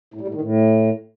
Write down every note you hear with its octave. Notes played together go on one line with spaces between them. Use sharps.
A2
G3
A2
D#3
A2